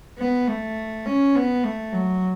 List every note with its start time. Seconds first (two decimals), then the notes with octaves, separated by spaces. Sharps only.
0.19 B3
0.48 A3
1.06 C#4
1.36 B3
1.64 A3
1.93 F#3